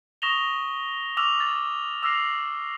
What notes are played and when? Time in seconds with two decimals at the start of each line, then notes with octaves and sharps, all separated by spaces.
0.22 C#6 D#6 A#6 E7 F7 G7
1.17 C#6 D6 E6 F6 A#6 F7
1.40 A6
2.02 D6 E6 F6 A#6 C7 F7